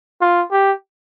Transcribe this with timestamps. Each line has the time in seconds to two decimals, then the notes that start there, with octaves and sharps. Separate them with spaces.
0.21 F4
0.51 G4